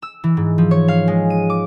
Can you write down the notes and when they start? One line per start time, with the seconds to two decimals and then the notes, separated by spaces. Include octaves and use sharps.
0.02 E6
0.24 E3
0.37 G#2
0.58 F3
0.71 C#5
0.88 F5
1.08 G#3
1.30 D#7
1.50 D6